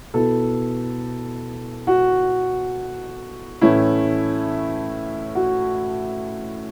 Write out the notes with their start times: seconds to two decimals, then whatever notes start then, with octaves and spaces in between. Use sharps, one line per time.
0.14 B2 B3 E4 A4
1.87 F#4
3.61 A2 E3 A3 C#4 E4
5.35 F#4